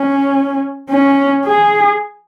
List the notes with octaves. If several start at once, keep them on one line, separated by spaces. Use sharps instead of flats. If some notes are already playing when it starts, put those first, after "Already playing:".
Already playing: C#4
C#4
G#4